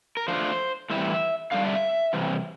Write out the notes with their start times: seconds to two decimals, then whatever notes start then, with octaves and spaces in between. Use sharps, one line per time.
0.17 A#4
0.28 F3 A3 D4 C5
0.90 A2 E3 G3 C4 E4 E5
1.52 D3 G3 D4 F5
1.67 E5
2.13 C3 E3 G3